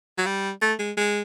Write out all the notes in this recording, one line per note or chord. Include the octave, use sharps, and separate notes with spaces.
F#3
G3
A3
G#3
G#3